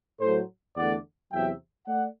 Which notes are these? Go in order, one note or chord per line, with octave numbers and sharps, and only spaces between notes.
A2 F#3 A3 A4 C5
E2 D3 A3 D5 F#5
E2 C3 F#3 E5 G5
A3 D5 F#5